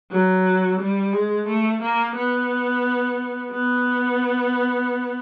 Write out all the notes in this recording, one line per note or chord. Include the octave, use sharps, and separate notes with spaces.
F#3
G3
G#3
A3
A#3
B3
B3